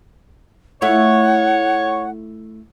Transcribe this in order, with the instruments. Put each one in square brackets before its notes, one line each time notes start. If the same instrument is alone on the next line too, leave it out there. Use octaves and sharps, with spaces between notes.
[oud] A3 E4 F4 [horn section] C#5 [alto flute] F#5